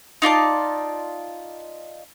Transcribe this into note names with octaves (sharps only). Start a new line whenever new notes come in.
D#4 F4 D5 A5